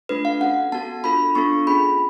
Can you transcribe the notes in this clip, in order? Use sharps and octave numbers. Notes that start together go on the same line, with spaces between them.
A3 D4 F4 A4 B4
F5
C#4 F#4 A4 F#5
B3 F#4 A4 A5
D4 F4 A4 B5
B3 D4 F4 A4 C#6
C#4 F4 G#4 B5